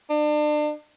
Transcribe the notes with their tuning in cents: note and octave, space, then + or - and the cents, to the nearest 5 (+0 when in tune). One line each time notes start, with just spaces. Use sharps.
D4 +35